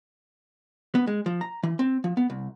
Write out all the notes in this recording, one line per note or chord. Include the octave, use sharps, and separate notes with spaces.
B3
G#3
F3
A#5
E3
C4
F3
B3
C2